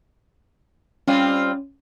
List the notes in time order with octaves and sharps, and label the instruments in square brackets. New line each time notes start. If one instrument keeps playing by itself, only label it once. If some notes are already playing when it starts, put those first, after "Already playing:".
[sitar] G3 C4 F4 [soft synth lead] C#4